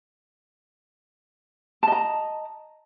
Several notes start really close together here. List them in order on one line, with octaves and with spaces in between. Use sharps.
A5 D#5 A#5